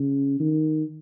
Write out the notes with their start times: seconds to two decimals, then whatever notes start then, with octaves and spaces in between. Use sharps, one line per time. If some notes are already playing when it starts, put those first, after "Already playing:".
Already playing: C#3
0.40 D#3